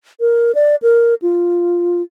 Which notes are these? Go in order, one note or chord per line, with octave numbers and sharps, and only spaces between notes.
A#4
D5
A#4
F4